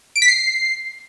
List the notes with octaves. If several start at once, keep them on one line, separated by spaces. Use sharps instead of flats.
D7
B6
C7